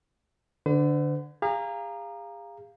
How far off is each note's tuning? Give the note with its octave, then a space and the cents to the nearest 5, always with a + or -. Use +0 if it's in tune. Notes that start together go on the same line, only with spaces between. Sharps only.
D3 +5 C5 -45
G#4 -40 F5 -5 A#5 +0